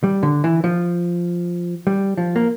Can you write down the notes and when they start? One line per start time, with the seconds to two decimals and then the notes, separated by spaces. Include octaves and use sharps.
0.04 G3
0.23 D3
0.44 E3
0.64 F3
1.87 G3
2.17 F3
2.36 A#3